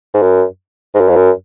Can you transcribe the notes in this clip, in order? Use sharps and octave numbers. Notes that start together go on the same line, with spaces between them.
G#2
F#2
G#2
F#2
F2
F#2